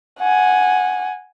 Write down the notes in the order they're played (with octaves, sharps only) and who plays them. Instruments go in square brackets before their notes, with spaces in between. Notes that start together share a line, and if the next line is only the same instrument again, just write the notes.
[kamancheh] F#5 G#5